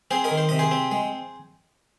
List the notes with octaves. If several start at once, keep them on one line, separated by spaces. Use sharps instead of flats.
C4 G#4 C5
A#4 D#5
D#3
C5
C3 D#5
G#4 C5
C4
G#3